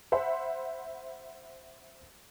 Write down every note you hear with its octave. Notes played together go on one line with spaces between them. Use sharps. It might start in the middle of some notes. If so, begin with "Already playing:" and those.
C5 E5 F#5 B5 C6